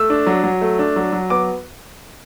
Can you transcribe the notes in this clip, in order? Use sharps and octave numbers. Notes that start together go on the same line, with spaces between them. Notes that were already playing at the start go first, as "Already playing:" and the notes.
Already playing: A3 E6
D4
F#3
F#3
A3
D4
F#3
F#3
B3 D6